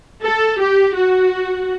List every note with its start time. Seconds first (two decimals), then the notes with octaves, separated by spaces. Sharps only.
0.23 A4
0.59 G4
0.96 F#4